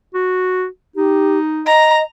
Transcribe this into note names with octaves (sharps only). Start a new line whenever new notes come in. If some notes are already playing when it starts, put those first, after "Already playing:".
F#4
D#4 G4
D#5 A#5